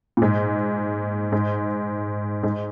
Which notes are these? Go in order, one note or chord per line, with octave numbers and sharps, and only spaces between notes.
A#2
G#2
G#2
G#2